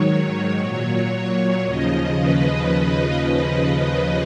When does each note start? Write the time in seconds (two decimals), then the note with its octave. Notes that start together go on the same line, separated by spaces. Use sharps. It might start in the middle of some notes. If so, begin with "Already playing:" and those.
Already playing: G#2 D#3 F#3 C#5
0.59 A#2 F#3
1.13 C#5
1.65 D#2 C#3 F3 D#5
2.18 B4